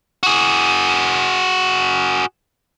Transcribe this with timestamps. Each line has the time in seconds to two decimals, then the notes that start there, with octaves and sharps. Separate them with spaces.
0.23 F#4 G#4